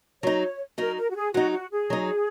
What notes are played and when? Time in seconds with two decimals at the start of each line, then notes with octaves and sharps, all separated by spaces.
0.22 F#3 D#4 C#5
0.78 F#3 D#4 A#4
0.97 A#4
1.10 F#4
1.16 G#4
1.34 F#3 D#4 F#4
1.53 F#4
1.71 G#4
1.90 F#3 D#4